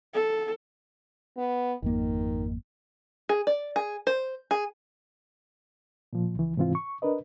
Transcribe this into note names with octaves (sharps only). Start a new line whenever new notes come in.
A4
B3
G#1 F2 D#3 A#3
G#4
D5
G#4
C5
G#4
A#2 F3
C#2 E3
G#2 C3 E3 C4 F4
C#6
D4 A#4 B4 D#5